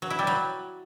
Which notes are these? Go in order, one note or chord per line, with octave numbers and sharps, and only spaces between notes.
F#3
E4
G3
F#3